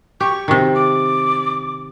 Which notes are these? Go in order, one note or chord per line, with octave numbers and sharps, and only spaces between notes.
G4 C#6
C3 D#3
D6